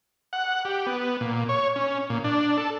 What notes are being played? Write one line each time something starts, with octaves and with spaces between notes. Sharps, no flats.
F#5
G4
B3
A#2
C#5
C#4
A#2
D4
A4